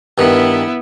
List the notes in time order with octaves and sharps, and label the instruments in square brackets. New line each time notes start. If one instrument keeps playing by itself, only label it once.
[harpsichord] G2 D#3 [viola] B3 E4